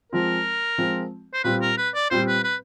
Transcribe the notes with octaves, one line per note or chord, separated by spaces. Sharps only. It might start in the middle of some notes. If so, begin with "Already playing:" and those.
F3 G#3 C4 F4 A#4
F3 G#3 C4 F4
C5
A#2 G3 C4 F4 B4
A#4
B4
D5
A#2 G3 C4 F4 C5
B4
B4